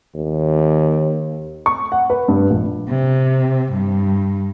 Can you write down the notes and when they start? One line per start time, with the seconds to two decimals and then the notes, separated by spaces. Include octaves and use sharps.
0.15 D#2
1.66 C#6
1.92 F#5
2.10 B4
2.28 G2
2.50 A#1
2.89 C3
3.73 G2